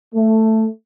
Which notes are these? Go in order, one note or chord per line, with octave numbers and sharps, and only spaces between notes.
A3